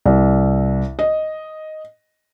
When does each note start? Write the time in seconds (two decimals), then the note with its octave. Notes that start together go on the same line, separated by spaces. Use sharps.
0.06 C2
0.99 D#5